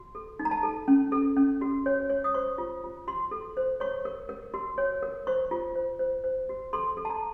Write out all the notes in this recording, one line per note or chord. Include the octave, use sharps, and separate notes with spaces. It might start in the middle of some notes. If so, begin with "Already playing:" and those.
Already playing: F#4
A4
D#4
A#5
A5
A4
C#4
A4
C#4
F#4
C#5
C#5
D#6
C5 C#6
F4
F4
F#4 C6
A4
C5
C#5 C#6
A#4
A#4
F#4
C#5
A#4
C5 C#6
F4
C5
C5
C5
F#4
A4 C6
A4
A5
A#5